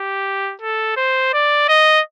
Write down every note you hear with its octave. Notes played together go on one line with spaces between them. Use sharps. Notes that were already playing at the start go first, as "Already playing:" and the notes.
Already playing: G4
A4
C5
D5
D#5